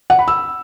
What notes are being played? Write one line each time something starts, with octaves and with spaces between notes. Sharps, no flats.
F#5
B5
E6